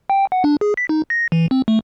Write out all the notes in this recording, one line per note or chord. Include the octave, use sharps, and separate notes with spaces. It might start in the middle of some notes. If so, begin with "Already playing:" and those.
G5
F#5
D4
G#4
B6
D#4
A#6
E3
C4
A3